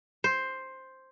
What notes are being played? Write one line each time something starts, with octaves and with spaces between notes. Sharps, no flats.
C5